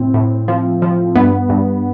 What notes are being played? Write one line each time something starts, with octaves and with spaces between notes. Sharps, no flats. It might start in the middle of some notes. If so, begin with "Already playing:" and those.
Already playing: A2 C4
A2
F3
F3
G2 B3
G2